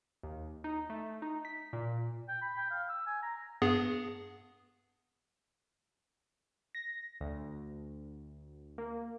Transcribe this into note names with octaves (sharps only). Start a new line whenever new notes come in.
D#2
D#4
A3
D#4
B6
A#2
G5
B5
G5
F5
E6
G#5
A#5
G2 B3 G#4
A#6
D2
A#3